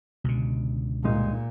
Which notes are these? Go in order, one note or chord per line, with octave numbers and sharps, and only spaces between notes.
C#2 B2 D3
G2 A#2 G#3 D#4